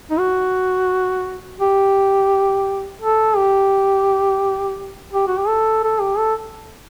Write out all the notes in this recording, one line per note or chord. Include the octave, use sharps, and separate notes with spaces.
D#4
F#4
G4
A4
G4
G4
F#4
G4
A4
A4
G4
A4